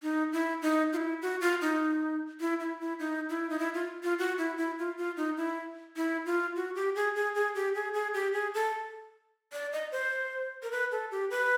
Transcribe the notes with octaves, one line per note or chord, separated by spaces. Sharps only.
D#4
E4
D#4
F4
E4
F#4
F4
D#4
E4
E4
E4
D#4
E4
D#4
E4
F4
F4
F#4
E4
E4
F4
F4
D#4
E4
E4
F4
F#4
G4
G#4
G#4
G#4
G4
G#4
G#4
G4
G#4
A4
D5
D#5
C5
A#4
B4
A4
G4
B4